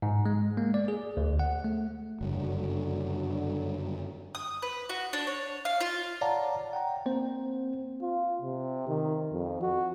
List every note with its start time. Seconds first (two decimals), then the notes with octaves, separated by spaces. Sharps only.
0.02 G#2
0.26 G#3
0.57 A#3
0.74 D5
0.88 G#4
1.17 D2
1.39 F#5
1.64 A3
2.21 F#1 G2 D3 F#3
4.35 D#6
4.62 B4
4.89 F#4
5.13 D4
5.27 C#5
5.65 F5
5.81 F4
6.21 C#5 D5 F5 F#5 A5 A#5
6.73 F#5 G5 A#5
7.06 A#3 C4 C5
8.02 F4
8.42 C3
8.88 D#3
9.32 F2
9.62 F#4